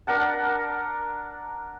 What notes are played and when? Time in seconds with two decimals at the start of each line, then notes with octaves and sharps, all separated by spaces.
0.07 D4 A#4 F#5 A5